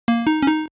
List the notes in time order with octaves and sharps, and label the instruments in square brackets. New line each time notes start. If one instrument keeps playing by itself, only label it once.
[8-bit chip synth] A#3
D#4
C#4
D#4